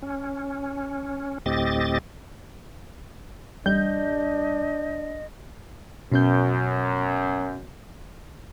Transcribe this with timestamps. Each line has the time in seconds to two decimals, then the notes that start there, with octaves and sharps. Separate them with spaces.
0.02 C#4
1.46 D2 A2 C4 G4 D#5 A6
3.66 A1 G3 D4 D#5 G6
6.12 F#2 B2 C#4 G6